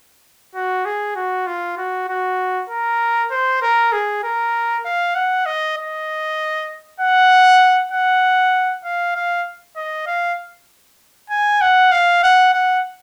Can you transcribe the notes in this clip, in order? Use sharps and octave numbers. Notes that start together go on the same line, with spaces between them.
F#4
G#4
F#4
F4
F#4
F#4
A#4
C5
A#4
G#4
A#4
F5
F#5
D#5
D#5
F#5
F#5
F5
F5
D#5
F5
G#5
F#5
F5
F#5
F#5